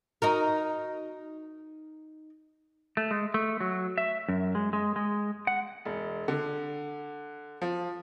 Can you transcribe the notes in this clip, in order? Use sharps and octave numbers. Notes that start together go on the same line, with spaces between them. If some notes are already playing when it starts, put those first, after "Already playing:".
D#4 F#4 A#4
A3
G#3
A3
F#3
E5
F#2
G#3
G#3
G#3
F#5
E1
D3
F3